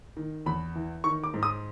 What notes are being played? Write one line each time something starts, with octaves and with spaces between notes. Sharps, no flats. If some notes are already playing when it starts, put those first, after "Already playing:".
D#3
E2 B5
E3
D#3 C#6
D6
G#2
D#6